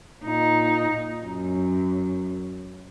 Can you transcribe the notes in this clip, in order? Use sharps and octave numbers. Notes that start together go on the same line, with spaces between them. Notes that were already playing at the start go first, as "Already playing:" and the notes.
A#2 D#4
F#2